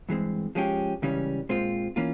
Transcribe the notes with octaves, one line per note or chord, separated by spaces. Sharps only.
G2 E3 G#3 C4
F3 G#3 C#4 G4
C#2 C#3 E3 G3 C#4
A#2 G#3 C4 F4 C5
E3 A#3 C#4 F4